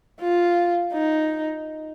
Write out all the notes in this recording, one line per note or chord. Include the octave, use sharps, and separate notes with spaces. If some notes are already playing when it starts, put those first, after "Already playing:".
F4
D#4